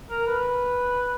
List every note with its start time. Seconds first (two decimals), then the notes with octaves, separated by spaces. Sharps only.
0.10 A#4
0.27 B4